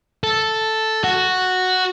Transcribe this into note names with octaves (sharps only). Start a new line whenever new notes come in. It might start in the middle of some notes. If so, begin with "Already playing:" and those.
A4
F#4